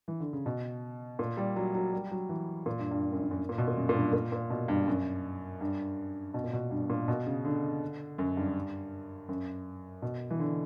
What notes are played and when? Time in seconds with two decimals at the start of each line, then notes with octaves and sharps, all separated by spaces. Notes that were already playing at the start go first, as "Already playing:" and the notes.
0.08 E3
0.20 D3
0.33 C#3
0.46 B2
1.19 A#2
1.37 G3
1.56 F#3
1.75 F#3
1.93 G3
2.12 F#3
2.29 E3
2.66 A#2
2.79 G2
2.91 G2
3.03 G2
3.12 F#2
3.22 G2
3.31 F#2
3.49 A#2
3.58 B2
3.68 A#2
3.77 F#2
3.89 A#2
3.95 G2
4.13 A#2
4.32 A#2
4.50 B2
4.68 G2
4.87 F#2
5.61 G2
6.34 B2
6.44 A#2
6.53 B2
6.71 G2
6.90 A#2
7.08 B2
7.26 C#3
7.45 D3
8.18 F#2
8.37 G2
9.29 F#2
10.02 B2
10.30 E3
10.39 D3